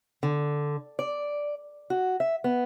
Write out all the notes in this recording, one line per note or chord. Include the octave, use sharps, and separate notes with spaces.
D3
D5
F#4
E5
B3